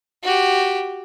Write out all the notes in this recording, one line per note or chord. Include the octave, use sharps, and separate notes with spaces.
F#4 G4